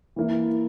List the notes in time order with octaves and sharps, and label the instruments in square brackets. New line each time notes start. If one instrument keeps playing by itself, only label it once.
[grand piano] E3 A#3 E4